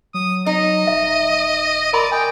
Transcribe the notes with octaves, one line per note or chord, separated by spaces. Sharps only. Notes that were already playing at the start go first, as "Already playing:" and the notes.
F#3 D#6
D#4 D#5
D#1 E5
A#4 D5 B5 C6
G5 G#5 D#6